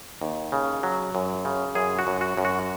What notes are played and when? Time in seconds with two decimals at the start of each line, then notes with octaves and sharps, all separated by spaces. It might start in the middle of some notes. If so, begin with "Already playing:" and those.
0.21 D#2
0.52 C#3
0.83 F#3
1.15 F#2
1.45 C#3
1.75 F#2 G#4
1.99 F#4
2.07 F#2
2.21 F#4
2.37 F#2
2.45 F#4